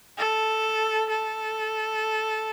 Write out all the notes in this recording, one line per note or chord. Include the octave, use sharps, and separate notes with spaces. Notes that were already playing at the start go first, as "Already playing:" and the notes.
A4
A4